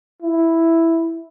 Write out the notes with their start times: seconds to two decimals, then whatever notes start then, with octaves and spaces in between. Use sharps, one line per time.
0.22 E4